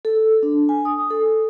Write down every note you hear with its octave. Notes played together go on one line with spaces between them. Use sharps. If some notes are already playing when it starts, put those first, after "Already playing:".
A4
D4
G#5
D#6
A4